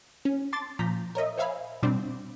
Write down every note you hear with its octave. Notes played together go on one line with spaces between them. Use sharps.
C#4
A5 C6 D6 A6
A#2 F3 A#5 G6 B6
A#4 C#5 D#5 E5
C5 C#5 E5 F5 G#5 B5
B2 G3 C4 D4